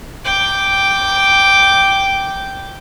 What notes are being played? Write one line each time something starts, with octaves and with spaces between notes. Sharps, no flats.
G5 D6